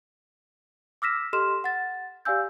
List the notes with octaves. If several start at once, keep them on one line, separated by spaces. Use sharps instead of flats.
D6 E6 F6 A#6 B6 E7
G4 A4 D#5 C6 F6 E7
F#5 A6
G4 D5 F5 G#5 E6 G6